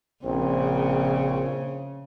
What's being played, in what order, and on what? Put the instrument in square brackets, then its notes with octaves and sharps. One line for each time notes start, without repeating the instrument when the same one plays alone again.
[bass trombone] A#1 [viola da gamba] C#3 [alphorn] C4